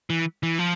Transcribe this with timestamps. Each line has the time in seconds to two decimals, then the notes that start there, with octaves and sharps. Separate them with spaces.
0.10 E3
0.43 E3
0.59 F3